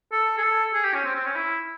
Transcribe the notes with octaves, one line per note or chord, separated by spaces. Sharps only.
A4
G#4
A4
G#4
G4
C#4
C4
C4
C#4
E4